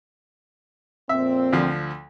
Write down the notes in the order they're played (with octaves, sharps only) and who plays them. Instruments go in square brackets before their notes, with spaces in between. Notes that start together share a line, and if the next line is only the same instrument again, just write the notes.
[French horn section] F2 A#2 C4 [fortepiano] E5
[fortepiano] D2 F3